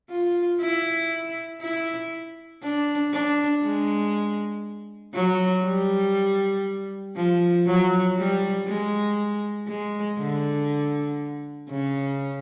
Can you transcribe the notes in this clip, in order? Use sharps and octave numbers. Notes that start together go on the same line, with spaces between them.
F4
E4
E4
D4
D4
G#3
F#3
G3
F3
F#3
G3
G#3
G#3
D3
C#3